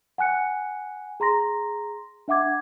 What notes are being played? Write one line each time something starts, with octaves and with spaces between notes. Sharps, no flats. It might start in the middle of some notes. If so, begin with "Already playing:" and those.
F#5 G#5 F#6 C#7
G#4 A#5 C6 A#6
D4 E5 F#5 D6 G#6